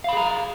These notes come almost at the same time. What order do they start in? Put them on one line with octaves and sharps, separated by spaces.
F5 B5 G#4 A#5